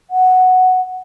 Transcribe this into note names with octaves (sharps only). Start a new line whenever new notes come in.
F#5